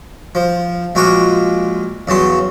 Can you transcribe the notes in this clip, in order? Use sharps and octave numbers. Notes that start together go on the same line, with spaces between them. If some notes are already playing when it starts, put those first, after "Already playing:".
F3
A#1 G#3 F4 F#4 D6
E2 C#3 F#3 C6